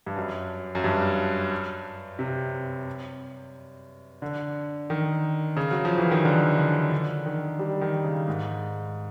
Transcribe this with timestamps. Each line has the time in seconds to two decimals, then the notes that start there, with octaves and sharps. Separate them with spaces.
0.06 G2
0.16 F#2
0.75 F#2
0.84 G2
2.19 C3
4.22 D3
4.90 D#3
5.57 C#3
5.71 F#3
5.85 F3
5.98 E3
6.11 D#3
6.25 D3
6.58 D3
6.91 D3
7.26 D#3
7.59 G3
7.81 D#3
8.04 C#3
8.28 G#2